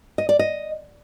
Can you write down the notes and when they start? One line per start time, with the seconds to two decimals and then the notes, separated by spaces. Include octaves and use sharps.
0.18 D#5
0.29 D5
0.39 D#5